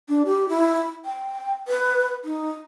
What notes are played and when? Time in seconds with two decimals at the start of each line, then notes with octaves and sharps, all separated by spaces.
0.09 D4
0.26 G4
0.49 E4
1.05 G5
1.68 B4
2.25 D#4